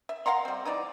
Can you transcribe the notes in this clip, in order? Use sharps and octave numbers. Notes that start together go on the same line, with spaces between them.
E5
F5 F#5 A#5 C6
G3 C4
E3 D#4 C#5 D5